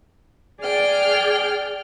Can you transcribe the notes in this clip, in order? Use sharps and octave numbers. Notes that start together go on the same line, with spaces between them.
G#4 D5 G5 F6